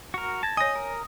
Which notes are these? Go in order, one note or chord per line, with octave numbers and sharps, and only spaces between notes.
F#4 A#4
A5 G#6 A#6
C#5 D#5 G#5 D#6 A#6
A#4